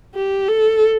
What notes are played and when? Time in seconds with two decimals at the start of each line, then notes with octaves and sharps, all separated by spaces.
0.15 G4
0.48 A4